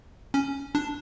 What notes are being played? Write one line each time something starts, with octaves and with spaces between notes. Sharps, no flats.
C#4
D4